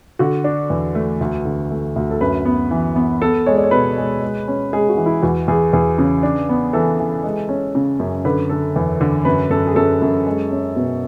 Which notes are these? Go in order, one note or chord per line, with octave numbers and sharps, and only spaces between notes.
D3 F#4
D4
E2
A3
D2
D3
A3
D2
A4
F#2 B4
B3
E3
B3
B3 A4
G#3 C#5
D5
C#5
B2 B4
G#3
G#3
C#4
G#3 G#4
F#4
E3
E4
E2 F#4
E2 G#4
E2 G#4
C#3
D4
B3
E3 A4
E3
G#3
C#4
C#3
F#2
D3 B4
D3 A4
E2
D3
F#2 B4
F#2 A4
G#4
F#2 A4
F#2
G#3
C#4
B2